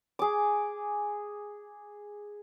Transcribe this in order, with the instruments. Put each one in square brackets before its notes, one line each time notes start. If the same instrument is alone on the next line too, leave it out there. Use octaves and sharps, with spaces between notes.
[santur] G#4 D6